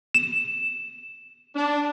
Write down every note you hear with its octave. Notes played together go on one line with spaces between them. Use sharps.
E7
D4